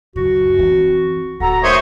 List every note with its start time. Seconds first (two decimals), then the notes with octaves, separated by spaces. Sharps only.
0.16 C#2 F#2 F#4
0.59 E3 C4
1.40 D1 F#4 A4 A#5
1.63 D#3 A3 C5 C#5 D#5 E5